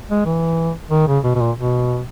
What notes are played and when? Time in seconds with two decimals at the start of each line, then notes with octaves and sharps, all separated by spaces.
0.10 G#3
0.26 E3
0.91 D#3
1.07 C#3
1.24 B2
1.35 B2
1.40 A#2
1.57 B2